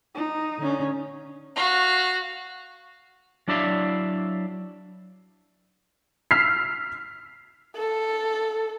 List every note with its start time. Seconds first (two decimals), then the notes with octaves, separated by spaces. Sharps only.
0.15 D#4
0.59 D3 C#4
1.56 F#4 F5
3.48 F#3 D4 E4 D5 E5 F5
6.31 E6 F6 B6 C7
7.76 A4